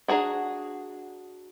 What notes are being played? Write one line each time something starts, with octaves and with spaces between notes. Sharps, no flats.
D4 F#4 G#4 A#5